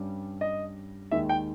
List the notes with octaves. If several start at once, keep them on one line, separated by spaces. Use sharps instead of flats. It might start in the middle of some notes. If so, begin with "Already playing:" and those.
Already playing: G2 G3 C#4
D#5
D#2 D#3 G#3 E5
G5